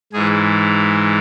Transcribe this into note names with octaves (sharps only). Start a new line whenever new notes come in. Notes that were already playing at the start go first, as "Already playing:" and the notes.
G#2 E3 G#4